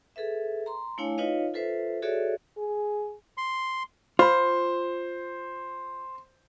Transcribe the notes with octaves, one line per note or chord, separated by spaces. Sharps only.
G#4 A4 B4 E5
A#5 C6
A3 D4 E4 C#5 F5 G#5
D#4 F4 B4 C#5 D#5 F5
F4 A4 B4 C5 E5
F#4 G#4 A4 C#5 D5 E5
G#4
C6
F4 C5 B5